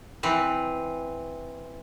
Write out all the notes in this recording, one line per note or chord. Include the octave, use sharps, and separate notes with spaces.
E3 C4